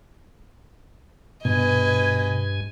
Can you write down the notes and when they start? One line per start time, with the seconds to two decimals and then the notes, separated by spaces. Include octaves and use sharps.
1.45 G2 B2 B4 D#5 G#5 G#6